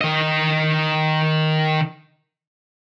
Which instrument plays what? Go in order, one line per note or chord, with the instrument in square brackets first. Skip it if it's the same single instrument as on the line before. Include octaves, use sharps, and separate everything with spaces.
[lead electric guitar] D#3 D#5